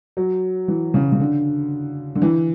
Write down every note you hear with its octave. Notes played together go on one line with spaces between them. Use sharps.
F#3
E3
C#3
C#3
D3
D3
E3